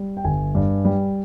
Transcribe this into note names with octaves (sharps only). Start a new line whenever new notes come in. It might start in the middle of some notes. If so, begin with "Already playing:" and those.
Already playing: G3
G5
G1 G#5
G2
G3